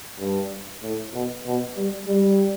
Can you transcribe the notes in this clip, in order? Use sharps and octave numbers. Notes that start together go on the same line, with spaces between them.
G2
A2
B2
B2
G3
G3